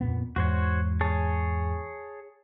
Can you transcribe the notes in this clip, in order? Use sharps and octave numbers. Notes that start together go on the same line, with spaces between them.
F2 A#2 B3
E2 G#2 F#4 C5 C#5
G#4 C#5 A5